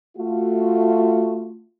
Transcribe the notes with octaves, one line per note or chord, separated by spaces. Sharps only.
A3 F4 F#4